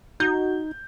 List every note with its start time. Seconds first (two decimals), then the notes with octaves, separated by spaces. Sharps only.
0.20 D#4 F#4 G6